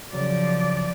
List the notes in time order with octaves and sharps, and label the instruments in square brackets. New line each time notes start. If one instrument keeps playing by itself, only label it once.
[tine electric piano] C#3 F#3 [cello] F3 D5